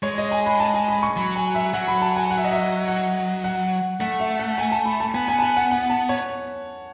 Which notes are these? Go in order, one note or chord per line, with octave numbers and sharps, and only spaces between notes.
G#3 C#5
D#5
G#5
B5
A5
G#5
B5
C#6
F#3 B5
G#5
E5
F#3 F#5
B5
A5
G#5
F#5
E5
D#5
E5
F#5
F#5
A3 F#5
E5
F#5
G#5
A5
B5
A5
B3 G#5
G#5
A5
G#5
F#5
F#5
A5
C#5